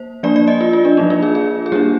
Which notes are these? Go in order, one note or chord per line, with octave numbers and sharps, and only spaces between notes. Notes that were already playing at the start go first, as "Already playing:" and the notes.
Already playing: A#3 C5
F3 A#3 D4 D5
D5
D#5
F4
F4
D4
F3 A#3 D4 D#4
F4
G#4
G#4
G#4
G3 A#3 D4 G4